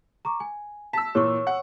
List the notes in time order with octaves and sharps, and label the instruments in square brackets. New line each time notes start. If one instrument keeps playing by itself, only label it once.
[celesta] A#5 C#6 D6
G#5
[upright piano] A5 E6 [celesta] B6
[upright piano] A#2 E3 [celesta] C#5 C#6
[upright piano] F#5